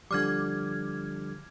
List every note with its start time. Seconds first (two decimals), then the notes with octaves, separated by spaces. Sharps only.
0.11 D3 F3 G3 D6 F6 G#6